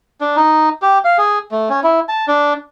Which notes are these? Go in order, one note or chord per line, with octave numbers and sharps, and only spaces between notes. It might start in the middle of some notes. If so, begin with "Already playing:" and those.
D4
D#4
G4
F5
G#4
A3
C#4
E4
A5
D4